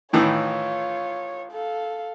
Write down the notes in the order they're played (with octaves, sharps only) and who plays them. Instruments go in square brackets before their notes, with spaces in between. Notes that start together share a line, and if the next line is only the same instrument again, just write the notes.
[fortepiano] A2 D#3 E3 [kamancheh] F4 C#5
[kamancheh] A4 F5